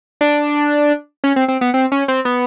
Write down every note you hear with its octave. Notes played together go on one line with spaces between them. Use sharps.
D4
C#4
C4
C4
B3
C4
C#4
C4
B3